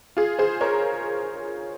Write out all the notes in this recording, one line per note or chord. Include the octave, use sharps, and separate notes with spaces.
F4 G#4
G#4 C5
A#4 C#5